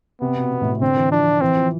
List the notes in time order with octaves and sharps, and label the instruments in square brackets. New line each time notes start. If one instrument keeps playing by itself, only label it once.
[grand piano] C3 [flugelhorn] B3
[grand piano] B2
B2
A2
C3
[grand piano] D3 [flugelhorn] C4
[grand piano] E3
[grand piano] F3 [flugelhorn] D4
[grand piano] F3
[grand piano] E3 [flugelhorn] C4
[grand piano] F3